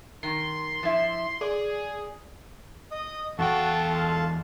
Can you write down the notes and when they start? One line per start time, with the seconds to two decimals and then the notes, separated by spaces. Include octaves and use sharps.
0.23 D#3 C6
0.83 F3 E4
1.41 G#4 D5
2.91 D#5 D#6
3.39 E2 F#4 A4 F5 G5 A5
3.91 F4